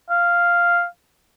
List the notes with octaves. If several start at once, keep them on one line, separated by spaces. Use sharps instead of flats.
F5